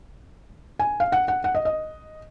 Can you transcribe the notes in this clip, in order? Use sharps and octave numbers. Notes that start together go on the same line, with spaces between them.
G#5
F5
F#5
F#5
F#5
D#5
D#5